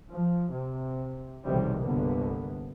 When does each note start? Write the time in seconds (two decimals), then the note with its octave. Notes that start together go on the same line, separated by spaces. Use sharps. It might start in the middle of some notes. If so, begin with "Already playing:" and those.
0.11 F3
0.52 C3
1.45 B1 E2 A2 C3 D#3 G3
1.82 G1 C2 D3 A#3 B3